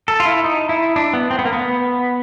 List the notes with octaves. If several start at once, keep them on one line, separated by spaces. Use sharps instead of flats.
A4
F4
E4
D#4
E4
D4
B3
C4
B3
A#3
B3